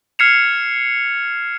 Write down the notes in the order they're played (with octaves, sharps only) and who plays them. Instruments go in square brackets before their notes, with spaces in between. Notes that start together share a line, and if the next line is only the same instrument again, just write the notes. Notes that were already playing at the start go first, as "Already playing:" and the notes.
[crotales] F6 G#6 C7 C#7 E7 F7